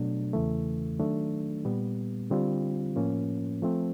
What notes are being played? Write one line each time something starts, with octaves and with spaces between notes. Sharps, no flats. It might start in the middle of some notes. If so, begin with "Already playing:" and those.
Already playing: B2 F#3 A3 D4
E2 C#3 E3 A3
D#3 F#3 A3 D4
A#2 G3 B3
D3 G3 C4 F4
A2 F3 A#3 C#4
F3 A3 C4